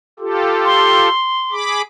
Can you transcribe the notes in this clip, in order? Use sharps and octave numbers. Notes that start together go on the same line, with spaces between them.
F4 G4 A4
C6
G#4 B5 D6